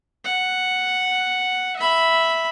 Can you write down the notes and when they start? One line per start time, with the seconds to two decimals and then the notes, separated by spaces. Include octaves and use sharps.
0.25 F#5
1.77 E5 B5